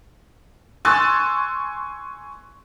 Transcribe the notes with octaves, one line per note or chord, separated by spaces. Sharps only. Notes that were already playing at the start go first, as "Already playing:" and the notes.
G#5 C6 C#6 E6 F#6 A6